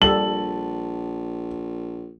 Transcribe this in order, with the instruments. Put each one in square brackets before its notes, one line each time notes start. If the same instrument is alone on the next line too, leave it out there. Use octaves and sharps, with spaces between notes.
[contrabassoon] A#1 [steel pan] G3 A4 [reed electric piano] A5 [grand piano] F#7